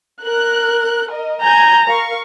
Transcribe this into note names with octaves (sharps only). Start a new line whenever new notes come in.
A#4 F#6
A#4 D#5
G#5 A#5 G6 G#6
A#4 F5 C#6